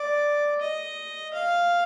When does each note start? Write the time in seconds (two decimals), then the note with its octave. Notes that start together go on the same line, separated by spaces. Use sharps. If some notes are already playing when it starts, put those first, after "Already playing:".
Already playing: D5
0.61 D#5
1.34 F5